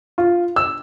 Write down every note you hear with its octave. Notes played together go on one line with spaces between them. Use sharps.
F4
E6